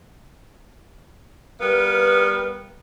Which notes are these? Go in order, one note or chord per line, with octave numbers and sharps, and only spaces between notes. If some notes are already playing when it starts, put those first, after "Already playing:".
G3 B3 A#4 B4 F5